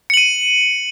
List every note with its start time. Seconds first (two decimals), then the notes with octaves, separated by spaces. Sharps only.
0.10 C#7
0.14 F#7
0.17 D#7